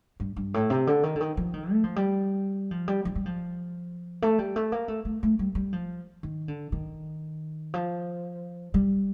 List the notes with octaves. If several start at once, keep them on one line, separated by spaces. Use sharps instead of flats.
G2
G2
A2
C3
D3
D#3
D3
D#3
F3
D#3
A3
F3
G3
F3
G3
F3
G3
F3
A3
G3
A3
A#3
A3
A3
A3
G3
G3
F3
D#3
D3
D#3
F3
G3